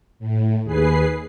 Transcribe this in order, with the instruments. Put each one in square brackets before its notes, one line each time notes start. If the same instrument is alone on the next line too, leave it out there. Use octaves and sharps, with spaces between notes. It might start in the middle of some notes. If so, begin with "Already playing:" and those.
[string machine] A2
D#2 G#4 B4 C7